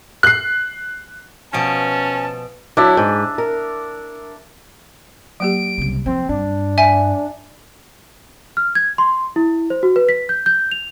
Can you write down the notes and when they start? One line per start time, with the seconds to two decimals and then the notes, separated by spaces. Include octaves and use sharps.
0.23 F#6 C7
1.53 B2 F3 C#4 A5
2.77 F#3 D4 E4 E5
2.97 G#2
3.38 A#4
5.40 F#3 A#3 G4 D7
5.78 C2 C#3
6.06 F3 C4
6.29 G2 D4
6.78 E5 G#5
8.57 F6
8.75 G#6
8.98 C6
9.36 E4
9.70 C5
9.83 F#4
9.96 B4
10.09 B6
10.29 G6
10.46 G6
10.71 F7